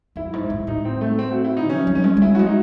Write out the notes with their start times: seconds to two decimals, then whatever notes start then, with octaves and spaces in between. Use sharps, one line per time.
0.16 F#2 E4
0.33 G#2
0.50 A2
0.67 A2 D#4
0.85 C4
1.01 A3
1.19 C4
1.32 F#4
1.44 E4
1.57 D#4
1.70 F#3 C#4
1.87 F#3
1.95 C#4
2.04 G#3
2.17 G#3
2.22 F#3 E4
2.35 F#4
2.39 G#3
2.46 D#4